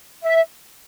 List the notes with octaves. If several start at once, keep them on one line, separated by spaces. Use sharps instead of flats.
E5